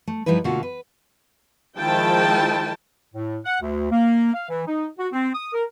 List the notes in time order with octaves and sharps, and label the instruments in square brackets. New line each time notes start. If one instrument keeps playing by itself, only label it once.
[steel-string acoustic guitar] A3
G2 F3 G3 D#4 E4 B4
B2 D3 A3 A#3 F4 F#4
B4
[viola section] D#3 F3 G#3 E4 G5 A5
[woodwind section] A2
F#5
D2
A#3
F5
E3
D#4
F#4
C4
D#6
A#4